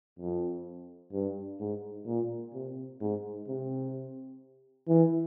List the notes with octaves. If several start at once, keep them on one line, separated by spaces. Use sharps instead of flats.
F2
G2
G#2
A#2
C3
G#2
C3
E3